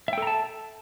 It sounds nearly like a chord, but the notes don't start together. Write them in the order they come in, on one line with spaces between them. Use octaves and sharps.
E5 G5 A4 A#5 A5